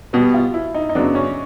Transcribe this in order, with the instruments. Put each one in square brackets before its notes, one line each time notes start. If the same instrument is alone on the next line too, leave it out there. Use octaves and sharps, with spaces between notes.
[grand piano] B2 G3 B3 [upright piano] F#4
[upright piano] F4
E4
D#4
D#4
[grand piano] F#2 C#3 F#3 B3 [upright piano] D4
[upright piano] C#4